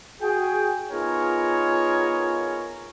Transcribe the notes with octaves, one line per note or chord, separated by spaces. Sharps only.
F#4 G#4 G5
B3 D#4 F4 G#4 A#4 C#5